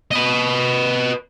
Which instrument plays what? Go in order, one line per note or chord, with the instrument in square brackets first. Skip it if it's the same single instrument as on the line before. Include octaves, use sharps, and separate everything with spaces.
[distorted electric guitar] B4 D#5